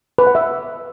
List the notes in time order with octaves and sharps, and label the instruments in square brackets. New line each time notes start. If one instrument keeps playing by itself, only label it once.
[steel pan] B4
F#5
E5